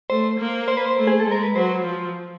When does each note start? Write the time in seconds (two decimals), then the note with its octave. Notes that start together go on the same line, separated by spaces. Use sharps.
0.10 A3 C5
0.39 A#3
0.68 C5
0.77 B4
0.85 C5
0.98 A3
1.07 G#4
1.20 A4
1.27 G#3 A#4
1.43 B4
1.55 F#3 C5
1.84 F3